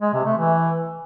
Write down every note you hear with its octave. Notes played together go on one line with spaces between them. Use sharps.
G#3
C3
A3
E3